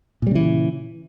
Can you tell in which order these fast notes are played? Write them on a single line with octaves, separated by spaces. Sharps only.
A#2 G3 C#3 E3